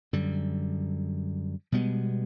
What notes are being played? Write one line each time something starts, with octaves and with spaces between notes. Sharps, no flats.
F#2 D3 G3
B2 G3 G#3 B3